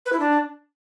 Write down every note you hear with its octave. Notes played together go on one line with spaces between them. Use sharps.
B4
E4
D4